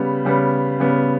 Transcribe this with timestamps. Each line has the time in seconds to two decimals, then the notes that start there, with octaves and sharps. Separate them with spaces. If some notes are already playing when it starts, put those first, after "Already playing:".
Already playing: C#3 G3 B3
0.25 C#3 G3 B3
0.80 C#3 G3 B3